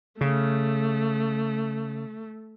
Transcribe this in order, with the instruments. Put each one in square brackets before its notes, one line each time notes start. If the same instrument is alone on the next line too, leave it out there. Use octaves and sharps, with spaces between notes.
[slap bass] C#3 [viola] A3